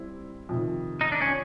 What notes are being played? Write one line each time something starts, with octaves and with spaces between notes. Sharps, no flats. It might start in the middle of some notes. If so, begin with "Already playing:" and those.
Already playing: G3 C4 E4
F2 C3 D#3
D#4
D4
C#4